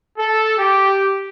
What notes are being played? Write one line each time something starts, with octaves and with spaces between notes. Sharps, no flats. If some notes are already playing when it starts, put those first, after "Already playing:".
A4
G4